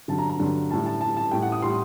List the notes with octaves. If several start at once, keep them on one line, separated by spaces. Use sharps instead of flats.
G2 D3 F#3 A5
A#5
A#5
G2 D3 F#3
A2 G3 A5
A5
A2 G3 A5
A5
A2 G3 G5
F#5
D#6
A2 G3 C6